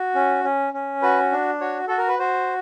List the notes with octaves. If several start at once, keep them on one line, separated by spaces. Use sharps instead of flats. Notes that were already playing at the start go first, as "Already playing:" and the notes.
Already playing: F#4
C#4
C#4
C#4
F#4 B4
D4
F#4 C#5
F#4 A4
A#4
B4
F#4 C5